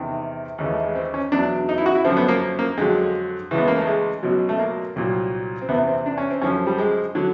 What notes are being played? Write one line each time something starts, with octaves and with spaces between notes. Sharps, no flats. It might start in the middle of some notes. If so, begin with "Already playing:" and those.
Already playing: E2 C3 D#3
D#2 C#3 E3
A3
G#3
C4
C#4
E2 B2 F#3 D4
D#4
E4
F#4
E4
F#2 D3 F3 C4
B3
A#3
A#3
F2 D3 F#3 G#3
C#2 C#3 E3
B3
A#3
A3
G#3
C#2 B2 F#3
A3
A#3
C2 A#2 F#3
C4
E2 C3 E3 B3
C4
D4
C#4
C4
F#2 D3 F3 C#4
G3
G#3
D3 F#3